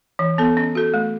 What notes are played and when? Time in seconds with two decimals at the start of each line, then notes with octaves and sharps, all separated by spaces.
0.19 E3
0.38 B3 A4
0.57 C#4
0.75 F#4 A4
0.94 A3